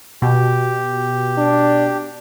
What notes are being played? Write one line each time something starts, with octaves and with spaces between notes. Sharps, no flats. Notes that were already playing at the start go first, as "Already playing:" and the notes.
B2 G4
D4